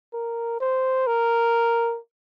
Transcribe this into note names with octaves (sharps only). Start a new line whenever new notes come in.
A#4
C5
A#4